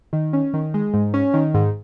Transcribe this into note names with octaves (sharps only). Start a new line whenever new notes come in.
D#3
C#4
D#3
G#3
G#2
C#4
D#3
G#2